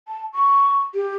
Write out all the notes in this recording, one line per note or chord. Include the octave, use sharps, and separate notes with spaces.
A5
C#6
G4